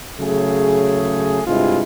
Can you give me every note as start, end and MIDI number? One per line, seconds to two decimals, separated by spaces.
0.20 1.42 49
0.20 1.42 54
0.20 1.42 57
0.20 1.42 68
1.47 1.83 43
1.47 1.83 48
1.47 1.83 56
1.47 1.83 64
1.47 1.83 65